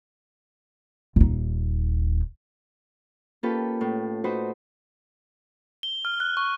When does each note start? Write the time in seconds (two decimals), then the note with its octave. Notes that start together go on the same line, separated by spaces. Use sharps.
1.16 D#1 D#4
3.43 A#3 C#4 F4 G4 A4 B4
3.81 A2
4.24 D#4 F#4 B4 C5
5.83 G7
6.05 F6
6.20 F#6
6.37 C#6